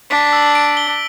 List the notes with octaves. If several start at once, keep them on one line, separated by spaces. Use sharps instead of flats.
D4 B6
E6
D7
G7